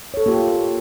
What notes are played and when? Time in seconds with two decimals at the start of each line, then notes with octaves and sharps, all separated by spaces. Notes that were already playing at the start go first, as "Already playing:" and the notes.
0.14 A4 C#5
0.26 A#3 F4 G4